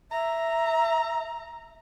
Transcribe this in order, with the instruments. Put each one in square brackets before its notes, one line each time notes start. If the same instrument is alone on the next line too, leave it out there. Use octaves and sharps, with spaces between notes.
[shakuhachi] E5 [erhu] A#5